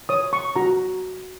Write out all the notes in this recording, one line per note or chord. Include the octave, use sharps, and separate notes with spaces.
C#5 D#6
C#6
F#4 A#5